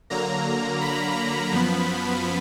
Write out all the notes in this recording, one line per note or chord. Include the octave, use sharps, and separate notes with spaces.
D3 F#3 A#3 A#5
B5
F#2 F3 B3